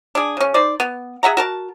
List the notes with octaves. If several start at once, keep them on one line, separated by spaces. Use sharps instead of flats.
D4 G#4
C#3 C#4
D#4 C5 D5
B3
G#4 E5 F#5 A#5
F#4 A#4 A5